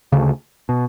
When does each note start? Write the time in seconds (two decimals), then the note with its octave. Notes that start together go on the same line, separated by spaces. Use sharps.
0.12 D2 C#3
0.69 B2